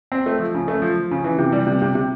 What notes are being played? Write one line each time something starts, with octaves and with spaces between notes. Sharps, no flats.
C4
A3
F3
C#3
A3
F3
F3
C#3
E3
C3
G3
C3
C3
C3